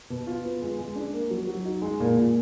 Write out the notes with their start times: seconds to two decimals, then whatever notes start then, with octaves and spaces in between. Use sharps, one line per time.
0.10 B2
0.27 F4
0.44 B3
0.62 G#3
0.79 G#3
0.96 D4
1.13 A#3
1.30 F#3
1.47 F#3
1.65 D#4
1.82 G#3
2.00 A#2
2.17 A#2